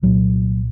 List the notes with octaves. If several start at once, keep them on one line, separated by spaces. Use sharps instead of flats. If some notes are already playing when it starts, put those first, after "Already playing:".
C2 A#2 F#3